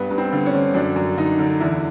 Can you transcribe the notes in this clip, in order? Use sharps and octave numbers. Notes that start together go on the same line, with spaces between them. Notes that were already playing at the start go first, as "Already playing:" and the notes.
Already playing: G2 B3
G2
C4
D3
C#4
D3
F#2 D4
F#2
D3 D#4
D3
E2 E4